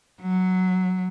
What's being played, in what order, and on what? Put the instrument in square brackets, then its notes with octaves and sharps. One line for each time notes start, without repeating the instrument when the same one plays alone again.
[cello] F#3